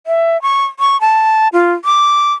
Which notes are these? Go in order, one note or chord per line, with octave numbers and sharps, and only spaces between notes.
E5
C#6
C#6
A5
F4
D6